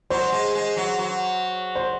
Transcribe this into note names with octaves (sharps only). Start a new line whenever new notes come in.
F#3 C5
G#3
G#3
F#3
F#3
C5